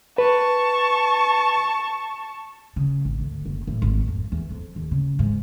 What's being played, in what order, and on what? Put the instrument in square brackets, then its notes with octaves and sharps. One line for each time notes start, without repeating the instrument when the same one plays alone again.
[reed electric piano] B4 [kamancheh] A5 C#6
[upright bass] C#3
G#1
D2
F#1
A2
G#1
F2
E2
F2
D#2
C#3
G#2